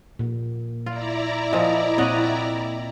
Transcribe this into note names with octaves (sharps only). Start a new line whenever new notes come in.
A#2
E4 F4 D5 A#5
A#2 F3 D#5
A#2 C4 C#5 D#5 F#5